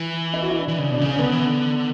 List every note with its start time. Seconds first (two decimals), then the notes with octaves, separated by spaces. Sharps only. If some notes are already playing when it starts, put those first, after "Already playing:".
Already playing: E3
0.34 E4
0.42 F#4
0.51 E4
0.59 D4
0.68 E3
0.79 C#3
0.91 B2 D4
1.01 C#3 C#4
1.13 C#4
1.19 D3 B3
1.32 E3
1.45 D3